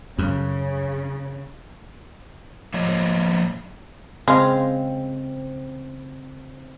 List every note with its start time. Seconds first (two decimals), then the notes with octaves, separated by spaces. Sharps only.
0.19 F#2 C#3
2.74 F3 A#3 C#5 D#5
4.28 C#3 G#3 C4 F4